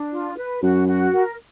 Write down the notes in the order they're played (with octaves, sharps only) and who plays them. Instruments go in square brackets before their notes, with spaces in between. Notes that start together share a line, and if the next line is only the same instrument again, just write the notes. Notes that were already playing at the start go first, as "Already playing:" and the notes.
Already playing: [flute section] D4
F4
B4
[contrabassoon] F#2 [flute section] F#4
[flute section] F#4
A#4